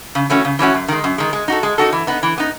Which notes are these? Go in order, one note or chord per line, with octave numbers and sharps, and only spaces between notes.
C#3
E3 A3 C#4 F#4
C#3
E3 A3 C#4 F#4
F#2
D#3 G#3
F#2
D#3 G#3
G#3
D#4 F#4 A4
G#3
D#4 F#4 A4
E3
B3 D#4
E3
B3 D#4